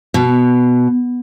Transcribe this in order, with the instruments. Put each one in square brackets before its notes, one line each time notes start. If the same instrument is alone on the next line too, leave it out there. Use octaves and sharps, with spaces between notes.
[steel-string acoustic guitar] B2